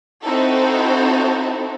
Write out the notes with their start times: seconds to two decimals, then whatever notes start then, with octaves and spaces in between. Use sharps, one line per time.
0.24 C4 D#4 E4 F#4 A4